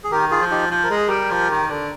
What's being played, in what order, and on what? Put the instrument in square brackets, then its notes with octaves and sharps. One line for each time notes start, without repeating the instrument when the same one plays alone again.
[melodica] G#4
[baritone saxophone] D#3 [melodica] G4 A#4
[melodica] F4 G#4
[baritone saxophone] F3
[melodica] D#4 G4
[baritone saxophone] F3 [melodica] C5
[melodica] A#4
[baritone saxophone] G#3
[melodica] G#4
[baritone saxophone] G3 [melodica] G4 A#4
[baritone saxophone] F3
D#3
D3